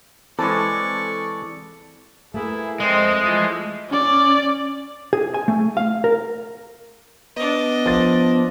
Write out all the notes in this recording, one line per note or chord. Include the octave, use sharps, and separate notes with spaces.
E3 G#3 C4 A4 D5 A5 C#6
A3 A#3 E4 G#4 B4
F2 G#3 C4 D#5
E3 F3
C#4 D5
G#4
G#5
A3
F5
A#4
B3 D4 D#5
F3 A6